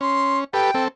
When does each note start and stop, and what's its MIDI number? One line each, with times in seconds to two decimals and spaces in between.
0.01 0.44 61
0.01 0.40 84
0.53 0.71 67
0.53 0.71 69
0.53 0.71 71
0.53 0.84 79
0.75 0.88 60
0.75 0.88 69